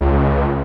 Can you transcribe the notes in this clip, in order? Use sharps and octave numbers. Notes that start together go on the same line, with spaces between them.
C#2